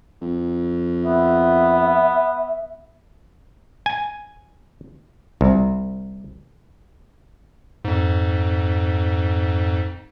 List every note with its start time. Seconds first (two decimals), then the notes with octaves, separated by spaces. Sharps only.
0.22 F2
1.04 B3 E5
3.86 G#5
5.41 C2
7.85 F2 G#2